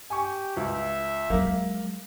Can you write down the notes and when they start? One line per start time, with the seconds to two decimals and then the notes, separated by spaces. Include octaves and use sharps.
0.10 G4 G#5 C#6
0.57 C#2 E5
1.30 F#3 G#3 A#3